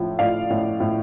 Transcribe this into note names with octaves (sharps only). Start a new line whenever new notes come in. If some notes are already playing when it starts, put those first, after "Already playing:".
Already playing: A2 F3
A2 D5 F5
A2
A2